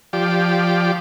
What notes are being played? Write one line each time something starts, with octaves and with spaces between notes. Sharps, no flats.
F3 G4 D5